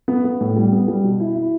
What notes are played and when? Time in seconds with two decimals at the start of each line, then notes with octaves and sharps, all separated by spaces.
0.08 B3
0.24 B3
0.41 A2
0.56 G3
0.72 B3
0.88 G3
1.04 B2
1.20 E4
1.36 E4